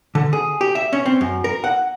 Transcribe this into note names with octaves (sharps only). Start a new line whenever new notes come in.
D3
G#4
G4
E5
C#4
C4
F#2
A#4
F#5